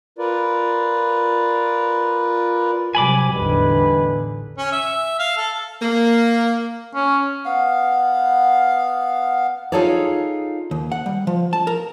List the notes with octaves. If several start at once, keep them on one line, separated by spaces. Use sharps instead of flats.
F4 A#4 B4 D5
C3 F#3 G3 G#5 B5 D6
A1 E2 D3 G3 D#4 B4
C#4
E5
F5
A4
A#3
C#4
B3 F5
D#4 F4 G#4 A4 C#5 D5
D#2
F#5
G3
F3
A5
A#4